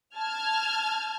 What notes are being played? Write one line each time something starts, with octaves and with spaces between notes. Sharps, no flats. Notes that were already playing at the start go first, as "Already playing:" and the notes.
A5 F6 G#6